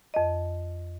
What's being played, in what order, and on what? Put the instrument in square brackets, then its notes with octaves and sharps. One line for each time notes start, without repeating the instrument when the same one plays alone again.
[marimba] F2 D#5